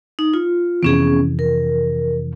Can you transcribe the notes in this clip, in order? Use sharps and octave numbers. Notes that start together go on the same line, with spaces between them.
D#4
F4
F2 C3 E3 B3 C#4 G#4
A#4